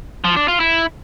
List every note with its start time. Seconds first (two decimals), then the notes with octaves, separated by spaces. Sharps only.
0.24 F3
0.36 D4
0.48 F4
0.60 E4